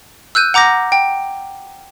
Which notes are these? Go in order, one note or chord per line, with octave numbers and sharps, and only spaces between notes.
E6 F#6 G6 D#7
F#5 A#5 D6 G6 A#6
G5